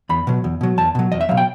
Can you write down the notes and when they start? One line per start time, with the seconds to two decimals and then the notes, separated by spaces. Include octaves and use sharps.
0.09 E2 B5
0.27 B2 F#3
0.44 E2
0.61 B2 F#3
0.78 E2 A5
0.95 B2 F#3
1.12 E2 D#5
1.21 E5
1.29 B2 F#3 F5
1.37 G5